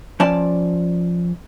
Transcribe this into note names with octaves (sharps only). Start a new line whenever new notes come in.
F3 C#4 D5 A5